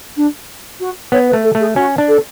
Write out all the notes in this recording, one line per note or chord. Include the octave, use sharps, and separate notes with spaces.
D4
F#4
B3 C#5
B4
A3
A4
A3
G#4
C#4 F#4
D4
A4